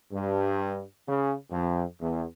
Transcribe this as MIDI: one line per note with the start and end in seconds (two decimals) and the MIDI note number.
0.12 0.81 43
1.08 1.34 49
1.50 1.83 41
2.00 2.24 40